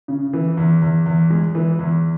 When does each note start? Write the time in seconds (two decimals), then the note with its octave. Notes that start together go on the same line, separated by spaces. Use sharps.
0.08 C#3
0.33 E3
0.57 E2
0.82 E2
1.06 E2
1.30 G#3
1.55 E3
1.79 E2